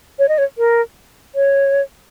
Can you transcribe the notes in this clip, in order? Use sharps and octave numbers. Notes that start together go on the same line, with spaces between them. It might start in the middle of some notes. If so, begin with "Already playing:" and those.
C#5
D#5
C#5
A#4
C#5